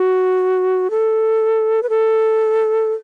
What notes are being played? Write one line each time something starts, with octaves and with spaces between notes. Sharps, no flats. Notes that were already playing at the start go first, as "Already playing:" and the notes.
Already playing: F#4
A4
B4
A4